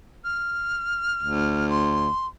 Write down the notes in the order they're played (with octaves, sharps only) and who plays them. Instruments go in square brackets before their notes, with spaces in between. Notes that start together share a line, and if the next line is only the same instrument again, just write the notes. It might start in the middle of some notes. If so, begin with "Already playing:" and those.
[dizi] F6
[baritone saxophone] D2
[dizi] C6